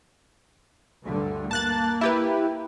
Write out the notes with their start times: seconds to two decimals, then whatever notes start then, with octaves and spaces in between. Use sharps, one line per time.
1.04 D2 G2 D3
1.51 A#3 A5 F#6 A6
2.01 E4 G4 B4